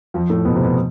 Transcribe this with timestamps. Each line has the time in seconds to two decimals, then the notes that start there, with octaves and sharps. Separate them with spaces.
0.14 F2 F3
0.29 A2 A3
0.45 B2 B3
0.54 C3 C4
0.64 B2 B3